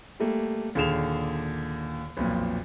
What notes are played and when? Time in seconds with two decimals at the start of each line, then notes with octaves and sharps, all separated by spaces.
0.20 G3 A3 A#3
0.75 D#2 A#2 D3 G#4 E7 F7
2.17 B1 F2 A#2